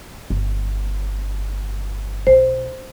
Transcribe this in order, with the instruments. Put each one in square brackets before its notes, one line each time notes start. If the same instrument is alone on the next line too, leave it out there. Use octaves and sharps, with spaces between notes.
[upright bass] G1
[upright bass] B1 [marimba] C5